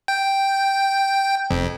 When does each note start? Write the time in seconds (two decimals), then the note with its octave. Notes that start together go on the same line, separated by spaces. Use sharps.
0.08 G5
1.50 F1 F2